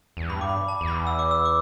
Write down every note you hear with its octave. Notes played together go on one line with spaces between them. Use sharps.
E2
G2 B5
D6
B5
A5
E2
B5
E6
D6
E6
D6